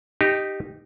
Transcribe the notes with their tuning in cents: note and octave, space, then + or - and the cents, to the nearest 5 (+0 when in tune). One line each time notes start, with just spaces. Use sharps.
D#4 -10 G4 +0